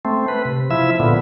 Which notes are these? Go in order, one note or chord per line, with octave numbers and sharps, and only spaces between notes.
A3 C4
B4
C3
F3 E4 E5
A#2 D3 F3 B3